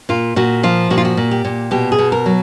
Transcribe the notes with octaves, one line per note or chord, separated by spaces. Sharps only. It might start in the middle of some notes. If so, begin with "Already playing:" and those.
A#2 F4
A#2 F#4
F3 F4
A#2 F#4
F4
F#4
A#2
G4
A#2
B2 G4
G#4
B2
A#4
F#3